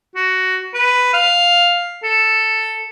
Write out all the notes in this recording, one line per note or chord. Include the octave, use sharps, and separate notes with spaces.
F#4
B4
F5
A4